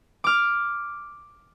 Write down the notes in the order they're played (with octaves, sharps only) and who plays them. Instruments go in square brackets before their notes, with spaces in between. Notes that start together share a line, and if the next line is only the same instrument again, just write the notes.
[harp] D6 F6